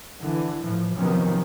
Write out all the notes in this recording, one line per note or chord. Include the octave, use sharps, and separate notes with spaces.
D3 E3
A2 E3 F3
C3 D#3 F3 F#3 B3 C#4